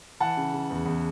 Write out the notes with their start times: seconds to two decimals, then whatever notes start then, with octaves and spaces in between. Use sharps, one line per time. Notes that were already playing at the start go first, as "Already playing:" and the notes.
0.20 E3 F#5 A5
0.37 C#3
0.53 C#3
0.70 E2
0.86 E2